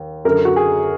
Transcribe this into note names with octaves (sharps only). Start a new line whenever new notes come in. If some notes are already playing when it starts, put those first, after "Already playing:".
Already playing: D#2
F#2 D3 A#4
F#4
G#4